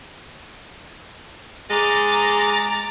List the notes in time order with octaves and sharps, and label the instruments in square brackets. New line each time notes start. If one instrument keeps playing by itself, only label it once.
[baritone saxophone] G#3 [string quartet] A#5 D6 A6